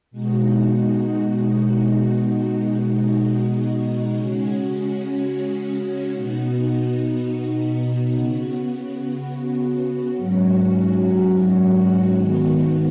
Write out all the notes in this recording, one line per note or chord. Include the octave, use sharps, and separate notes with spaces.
B2 G#3 D#4 F#4
B2 G#3 D#4 F#4
C#3 G#3 C#4 F#4
B2 B3 D#4 F#4
C#3 B3 F#4
G#2 F#3 C#4 F#4
G#2 D#3 B3 F#4